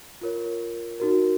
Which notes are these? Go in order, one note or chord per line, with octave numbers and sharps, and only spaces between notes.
F4 A#4 C#5
D#4 F#4 A#4